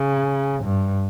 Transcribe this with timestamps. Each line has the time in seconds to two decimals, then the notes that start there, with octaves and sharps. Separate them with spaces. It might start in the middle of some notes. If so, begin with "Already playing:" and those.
Already playing: C#3
0.63 G2